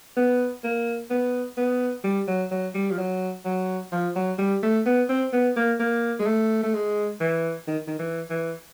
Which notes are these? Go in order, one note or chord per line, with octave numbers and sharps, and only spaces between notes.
B3
A#3
B3
B3
G3
F#3
F#3
G3
F3
F#3
F#3
F3
F#3
G3
A3
B3
C4
B3
A#3
A#3
G#3
A3
A3
G#3
E3
D#3
D#3
E3
E3